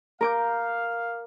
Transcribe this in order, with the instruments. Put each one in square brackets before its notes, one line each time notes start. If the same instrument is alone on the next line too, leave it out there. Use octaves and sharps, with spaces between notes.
[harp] A#4 D6 G6 [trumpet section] F5